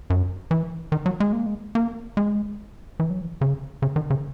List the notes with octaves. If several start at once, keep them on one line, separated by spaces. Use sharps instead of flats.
F#2
E3
D#3
F#3
G#3
A#3
G#3
A#3
G#3
E3
F#3
E3
C#3
C#3
D#3
C#3